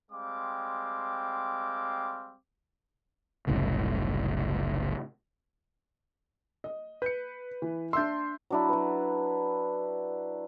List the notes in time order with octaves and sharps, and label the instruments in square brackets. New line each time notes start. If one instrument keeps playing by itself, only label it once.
[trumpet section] G3 G#3 C4 F5 D6
[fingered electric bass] F#1 C2 A2 C#3
[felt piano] D#5
[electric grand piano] B4 C#7 [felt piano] G6
[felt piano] E3
[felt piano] D4 E5 E6 [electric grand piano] C6 G6
[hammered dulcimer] F#3 D4 E4
F#3 B4